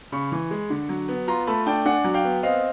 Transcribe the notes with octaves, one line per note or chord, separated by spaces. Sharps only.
C#3 B5 C#6
E3
G#3
D3
F#3
B3
F4 A#5 C6
A3 A5 B5
D4 G5 A5
D4 F#5 G#5
F#3
F5 G5
B3
C4 D#5 F5